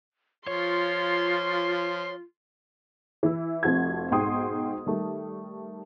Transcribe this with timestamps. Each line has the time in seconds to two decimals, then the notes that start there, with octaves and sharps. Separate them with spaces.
0.47 F3 F4 C#5 C6
3.23 E3 E4
3.63 F1 F2 F3 F#4 G#6
4.11 B1 G#2 F#4 G5 C6 D#6
4.86 D#3 G3 A3